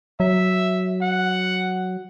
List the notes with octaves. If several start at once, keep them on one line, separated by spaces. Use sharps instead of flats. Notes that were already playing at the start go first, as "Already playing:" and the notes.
F#3 E5
F#5